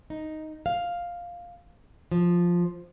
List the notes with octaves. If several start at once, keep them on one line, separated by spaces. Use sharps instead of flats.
D#4
F5
F3